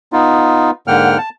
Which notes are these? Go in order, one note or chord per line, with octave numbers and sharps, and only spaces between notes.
B3 D#4 F4
G#2 D3 A#3 F#5 G5 F6
A5